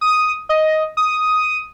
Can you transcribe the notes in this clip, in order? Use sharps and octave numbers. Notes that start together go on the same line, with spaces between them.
D#6
D#5
D#6